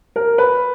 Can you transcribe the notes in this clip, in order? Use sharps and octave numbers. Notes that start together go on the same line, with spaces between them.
A#4
B4